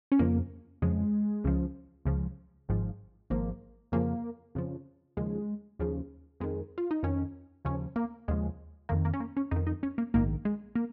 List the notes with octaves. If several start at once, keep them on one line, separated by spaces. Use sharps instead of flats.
C#4
F2 C#3 F3 A#3
F2 C#3 F3 G#3
C#2 C#3 F3
C#2 C#3 F3
G#1 G#2 F3
G#1 G#2 F3 A#3
F2 C#3 F3 A#3
F2 C#3 F3
D#2 C#3 F3 G#3
D#2 C#3 F3
F2 D#3 G#3
F4
D#4
F2 D#3 C#4
D#2 C#3 F3 C#4
A#3
D#2 C#3 F3 G#3
F2 D#3 A#3
A#3
C#4
A#3
C#4
F2 D#3 D#4
D#4
C#4
A#3
A#1 G#2 D#3 A#3
G#3
A#3